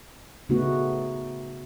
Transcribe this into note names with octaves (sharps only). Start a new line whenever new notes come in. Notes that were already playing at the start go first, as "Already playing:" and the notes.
C#3 A3 B3 D#4 F#4